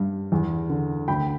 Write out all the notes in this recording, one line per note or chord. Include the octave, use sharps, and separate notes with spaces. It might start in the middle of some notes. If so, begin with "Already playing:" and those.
Already playing: G2
E2
D3
D2 G5 B5